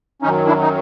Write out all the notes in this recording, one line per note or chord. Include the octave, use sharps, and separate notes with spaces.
F#2 D#3 F#3 C#4 D#4
D4 E4
D#4